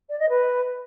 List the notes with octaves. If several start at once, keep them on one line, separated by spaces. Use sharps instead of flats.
D5
D#5
B4